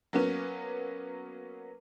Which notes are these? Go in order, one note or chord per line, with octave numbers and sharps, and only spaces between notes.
F#3 A#3 B3 C#4